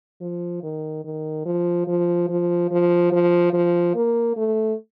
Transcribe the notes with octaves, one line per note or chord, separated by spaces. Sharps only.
F3
D#3
D#3
F3
F3
F3
F3
F3
F3
A#3
A3